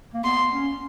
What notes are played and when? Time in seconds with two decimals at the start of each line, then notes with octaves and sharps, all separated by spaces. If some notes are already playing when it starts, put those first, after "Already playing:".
0.14 A#3
0.24 B3 C6
0.53 C#4